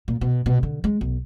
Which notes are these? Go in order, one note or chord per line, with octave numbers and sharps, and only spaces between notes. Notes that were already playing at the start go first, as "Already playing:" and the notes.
A#2
B2
B2
D3
G#3
B1